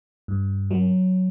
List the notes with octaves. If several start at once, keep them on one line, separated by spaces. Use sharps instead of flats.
G2
F#3